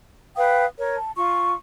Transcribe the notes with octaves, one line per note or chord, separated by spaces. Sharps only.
B4 F5 G5 D#6
A#4 C#5
A5
F4 C#6